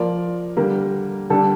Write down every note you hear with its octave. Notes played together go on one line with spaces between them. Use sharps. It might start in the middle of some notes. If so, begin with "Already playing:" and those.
Already playing: F3 A#3 F4 A#4 D5
D3 G3 A#3
D3 G3 D4 A4